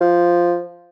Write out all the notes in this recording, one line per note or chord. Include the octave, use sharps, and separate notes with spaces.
F3